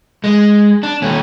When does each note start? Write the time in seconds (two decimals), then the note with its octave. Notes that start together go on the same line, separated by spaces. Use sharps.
0.24 G#3
0.83 D4
1.02 D#2 C#4